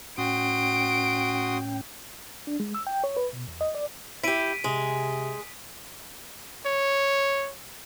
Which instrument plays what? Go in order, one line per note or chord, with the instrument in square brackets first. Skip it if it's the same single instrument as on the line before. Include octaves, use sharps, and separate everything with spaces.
[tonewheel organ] A2 C#4 G5 [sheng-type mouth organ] F#4 C6 D#6 [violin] D7
[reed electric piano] D4
G#3
E6
G5
C#5
B4
B2
E2
D#5
D5
[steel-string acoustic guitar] E4 G4 [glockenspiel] B6 D7 D#7
[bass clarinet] C3 [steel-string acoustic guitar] G#3
[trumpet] C#5